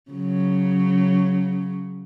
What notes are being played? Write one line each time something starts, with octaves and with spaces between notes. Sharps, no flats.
C#3 F#3